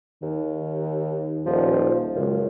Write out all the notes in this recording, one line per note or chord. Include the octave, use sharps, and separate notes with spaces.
D#2 D#3
D#1 F3
C#2 F#2